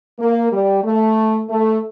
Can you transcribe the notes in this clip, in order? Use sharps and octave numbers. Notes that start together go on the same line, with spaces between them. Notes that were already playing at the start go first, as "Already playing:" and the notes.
A#3
G3
A3
A3